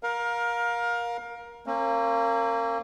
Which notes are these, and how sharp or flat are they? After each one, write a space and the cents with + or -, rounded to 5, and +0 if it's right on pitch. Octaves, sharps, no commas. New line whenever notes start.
A#4 +20 F5 +25
A#3 -20 C#4 -45